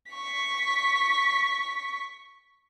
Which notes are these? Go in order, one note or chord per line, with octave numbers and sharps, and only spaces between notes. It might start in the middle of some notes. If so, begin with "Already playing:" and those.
C#6 B6